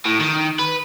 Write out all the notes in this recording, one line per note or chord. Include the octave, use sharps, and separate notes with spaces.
A2
D#3
B4